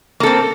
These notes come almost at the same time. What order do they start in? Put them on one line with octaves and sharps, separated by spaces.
A#3 A4 C4